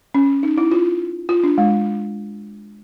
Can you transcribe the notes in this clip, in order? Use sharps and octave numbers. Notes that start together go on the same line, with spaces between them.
C#4
D#4
E4
F4
F4
D4
G#3